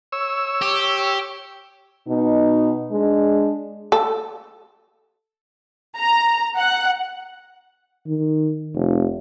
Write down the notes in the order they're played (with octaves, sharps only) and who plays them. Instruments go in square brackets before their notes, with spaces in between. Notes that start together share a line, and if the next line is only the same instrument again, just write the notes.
[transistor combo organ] C#5 E6
[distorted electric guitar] G4
[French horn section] B2 D#4
G#3 D4
[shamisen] A4
[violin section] A#5
F#5
[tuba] D#3
F1